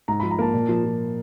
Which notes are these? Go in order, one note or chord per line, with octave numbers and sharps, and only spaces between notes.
G#2 A#5
F3 B5
A#5
A#3 A5
A#2
F3
F3